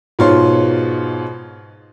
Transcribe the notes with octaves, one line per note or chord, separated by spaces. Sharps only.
G#2 B2 F4 C#5 C6